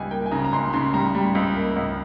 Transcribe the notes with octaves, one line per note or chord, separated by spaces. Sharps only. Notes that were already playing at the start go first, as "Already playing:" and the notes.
Already playing: C#2 G3 G#5
A#3 G5
G#5
C#3 A#5
A#5
C#2 C6
C#3 C6
G3 A#5
G3
C#2
A#3
C#2